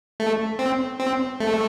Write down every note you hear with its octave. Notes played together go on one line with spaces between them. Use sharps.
A3
C4
C4
A3